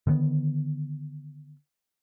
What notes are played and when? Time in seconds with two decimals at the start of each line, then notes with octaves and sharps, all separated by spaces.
0.07 D3 D#3 G3 B3